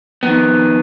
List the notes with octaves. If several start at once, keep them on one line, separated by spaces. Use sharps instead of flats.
F2 D#3 B3